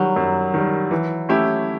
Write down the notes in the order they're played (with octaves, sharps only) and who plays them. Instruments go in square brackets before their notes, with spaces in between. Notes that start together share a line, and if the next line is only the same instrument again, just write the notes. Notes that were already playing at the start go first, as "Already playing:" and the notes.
Already playing: [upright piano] D#3 G3 [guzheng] F#3
[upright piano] F#2
D#3 G3
E3
A3 C#4 E4 G4